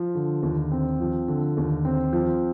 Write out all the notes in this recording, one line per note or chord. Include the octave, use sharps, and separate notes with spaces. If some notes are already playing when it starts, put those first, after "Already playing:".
Already playing: F3
D3
D#2
C4
F3
D3
D#2
C4
F3